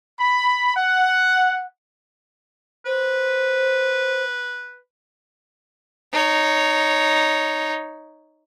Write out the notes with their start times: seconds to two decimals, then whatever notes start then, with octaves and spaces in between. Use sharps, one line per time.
0.19 B5
0.76 F#5
2.86 B4 C5
6.13 D#4 C#5